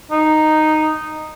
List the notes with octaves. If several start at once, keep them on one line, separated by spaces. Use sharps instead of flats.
D#4